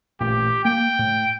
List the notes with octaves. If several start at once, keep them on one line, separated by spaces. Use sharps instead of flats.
A1 A#2 G4
A#3 G5
A2